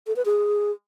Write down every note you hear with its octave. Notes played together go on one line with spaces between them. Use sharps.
A4
B4
G#4